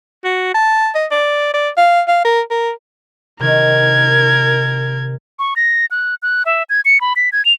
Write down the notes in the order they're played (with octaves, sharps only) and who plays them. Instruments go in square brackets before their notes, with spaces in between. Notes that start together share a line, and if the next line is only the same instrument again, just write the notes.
[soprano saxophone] F#4
A5
D#5
D5
D5
F5
F5
A#4
A#4
[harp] C3 D#3 [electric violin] A#4 G#6
[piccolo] C#6
A#6
F#6
F#6
E5
G#6
C#7
B5
B6
G#6
F7